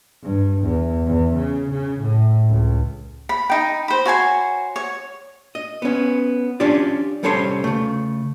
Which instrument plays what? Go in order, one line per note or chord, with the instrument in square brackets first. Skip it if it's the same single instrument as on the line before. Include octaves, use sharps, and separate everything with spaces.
[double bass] G2
E2
E2
C#3
C#3
A2
C#2
[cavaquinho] B5
D#4 G5
C5 B5
F#4 C#5 G#5 C6
C#5
[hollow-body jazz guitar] D#5
B3 C#4
C#4 D4 F4 G4 D5
C2 G3 C#4 A4 C#5 C6
C#3 A3